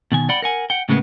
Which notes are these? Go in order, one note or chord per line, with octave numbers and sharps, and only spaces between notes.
B2 D#3 G#5
D5 F#5 G5 B5
A#4 F#5 G#5
F#5 G5
A2 C#3 G#3 A#3 B3